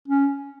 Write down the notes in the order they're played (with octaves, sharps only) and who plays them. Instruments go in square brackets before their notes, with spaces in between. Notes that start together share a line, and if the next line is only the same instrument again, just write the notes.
[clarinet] C#4